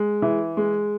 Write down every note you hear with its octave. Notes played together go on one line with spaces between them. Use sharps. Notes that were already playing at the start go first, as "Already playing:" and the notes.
Already playing: G#3
E3
G#3